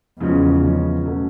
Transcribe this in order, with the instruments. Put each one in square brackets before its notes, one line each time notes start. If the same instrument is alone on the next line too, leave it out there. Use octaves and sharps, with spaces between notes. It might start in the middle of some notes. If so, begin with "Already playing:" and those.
[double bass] E2 [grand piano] C#3 F3 G#3 C#4
[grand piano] C#3 F3 G#3 C#4
B2 F#3 A3 C#4